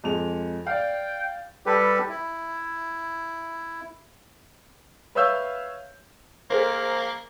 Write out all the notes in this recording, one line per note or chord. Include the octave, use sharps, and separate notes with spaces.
F2 G#3 F7
D5 F5 G5
G3 G4 A4 B4
E4
B4 C#5 E5 F5 E6 G6
A#3 G#4 A#4 C5